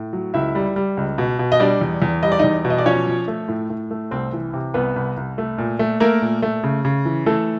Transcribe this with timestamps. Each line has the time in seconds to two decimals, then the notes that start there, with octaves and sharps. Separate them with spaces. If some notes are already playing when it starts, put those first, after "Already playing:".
Already playing: A2
0.13 F#3
0.34 C#2 E4 E5
0.55 G3
0.76 G3
0.97 C#2
1.18 B2
1.39 B2
1.52 D#5
1.60 G3 D4 D5
1.81 E2
2.02 E2
2.23 G3 D#5
2.32 D5
2.39 E2 D#4 D#5
2.65 B2
2.70 D#5
2.78 D5
2.86 F3 C#4 C#5
3.07 F3
3.28 A3
3.48 A2
3.70 A2
3.91 A3
4.11 C2 C4 C5
4.33 E3
4.53 C3
4.74 C2 B3 B4
4.96 C2
5.17 C2
5.38 A3
5.58 A#2
5.79 A3
6.00 A3 A#3 A#4
6.22 A#2
6.42 A3
6.64 C#3
6.85 C#3
7.05 E3
7.26 E3 A3 A4